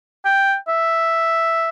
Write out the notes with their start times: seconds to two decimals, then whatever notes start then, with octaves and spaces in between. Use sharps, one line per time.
0.25 G5
0.68 E5